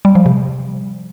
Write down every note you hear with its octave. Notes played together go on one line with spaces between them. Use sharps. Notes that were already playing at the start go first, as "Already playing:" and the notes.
G3
F3
C3